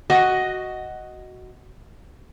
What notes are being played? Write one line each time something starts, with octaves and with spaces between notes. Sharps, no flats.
F#4 D#5